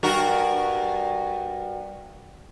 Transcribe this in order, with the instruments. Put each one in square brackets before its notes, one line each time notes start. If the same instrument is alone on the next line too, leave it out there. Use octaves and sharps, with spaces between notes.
[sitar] G2 F#4 A#4